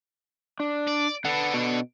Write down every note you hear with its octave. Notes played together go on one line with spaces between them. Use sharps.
D4
D5
D4 A4 B4 F#5
B2